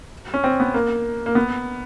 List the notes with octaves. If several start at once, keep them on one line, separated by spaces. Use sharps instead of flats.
C#4
C4
B3
A#3
A#3
B3